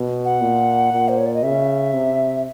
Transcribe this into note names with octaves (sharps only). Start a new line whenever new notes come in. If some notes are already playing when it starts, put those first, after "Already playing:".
Already playing: B2
F#5
A#2
A#2
C5
C#5
D5
D#5
C#3 E5
C3